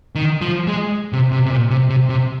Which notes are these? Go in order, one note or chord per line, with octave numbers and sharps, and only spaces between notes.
D#3
F3
G#3
C3
C3
C3
A#2
C3
C3
C3